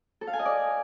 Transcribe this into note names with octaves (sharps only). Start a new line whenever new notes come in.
A4
F5
G#5
D#5
D5